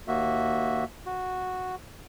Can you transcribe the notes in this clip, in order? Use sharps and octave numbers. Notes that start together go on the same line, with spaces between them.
D#2 A#3 F#4 E5
F#4